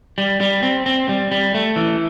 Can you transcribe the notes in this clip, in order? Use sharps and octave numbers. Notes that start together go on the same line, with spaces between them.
G3
G3
C4
C4
G3
G3
A3
E3